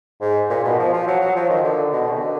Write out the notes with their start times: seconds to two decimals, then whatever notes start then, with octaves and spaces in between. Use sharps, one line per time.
0.21 G#2
0.50 A#2
0.64 B2
0.79 F3
0.93 F3
1.07 F#3
1.21 F#3
1.36 F3
1.49 D#3
1.64 D3
1.92 B2
2.12 D#3
2.20 D3